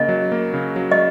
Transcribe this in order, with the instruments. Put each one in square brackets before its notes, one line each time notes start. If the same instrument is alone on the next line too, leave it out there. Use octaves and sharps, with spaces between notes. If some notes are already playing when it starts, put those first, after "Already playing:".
Already playing: [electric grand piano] C#3 A#3 [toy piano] D#5
[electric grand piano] F#3
A#3
C#3
F#3
[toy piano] D#5